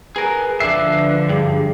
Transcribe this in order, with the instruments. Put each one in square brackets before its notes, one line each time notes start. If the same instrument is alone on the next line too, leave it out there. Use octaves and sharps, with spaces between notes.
[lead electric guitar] G#4 A#4 [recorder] B4
[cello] D3 F3 [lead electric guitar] D4 E5 [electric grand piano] C7
[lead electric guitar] G2 [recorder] G#4